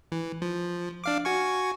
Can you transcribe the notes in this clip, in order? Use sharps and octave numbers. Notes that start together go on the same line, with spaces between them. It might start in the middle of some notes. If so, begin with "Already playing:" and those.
E3
F3
D4 F5 D6
F#4 G#5 C#6